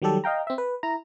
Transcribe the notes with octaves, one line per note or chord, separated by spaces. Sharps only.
D#3 F#3 G3 G4 A4
D#5 F5 G5 A#5
C4 E5
B4
E4 A#5